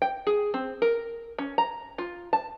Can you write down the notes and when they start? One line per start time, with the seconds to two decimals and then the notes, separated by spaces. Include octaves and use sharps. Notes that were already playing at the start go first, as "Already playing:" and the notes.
0.02 G5
0.27 G#4
0.54 C4
0.82 A#4
1.39 C#4
1.58 A#5
1.98 F4
2.33 A5